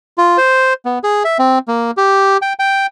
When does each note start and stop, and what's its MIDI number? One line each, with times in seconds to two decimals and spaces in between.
0.18 0.38 65
0.38 0.73 72
0.85 0.99 59
1.03 1.23 68
1.24 1.38 76
1.39 1.59 60
1.68 1.91 58
1.97 2.37 67
2.42 2.53 79
2.59 2.86 79